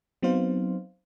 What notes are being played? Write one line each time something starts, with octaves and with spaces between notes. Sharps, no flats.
F#3 B3 C4 D#4 C5 F5